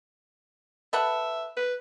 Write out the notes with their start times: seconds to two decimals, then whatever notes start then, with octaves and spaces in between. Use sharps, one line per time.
0.93 A4 B4 E5 F#5
1.56 B4